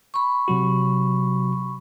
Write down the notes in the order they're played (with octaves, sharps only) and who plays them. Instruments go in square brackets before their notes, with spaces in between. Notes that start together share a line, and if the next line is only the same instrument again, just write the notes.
[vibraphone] B5 C#6
[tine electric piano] C3 F#3 F#4